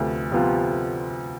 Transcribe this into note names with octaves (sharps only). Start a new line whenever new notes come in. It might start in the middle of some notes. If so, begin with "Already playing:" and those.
Already playing: D2 C3 F3 B3
C3 F3 B3 F4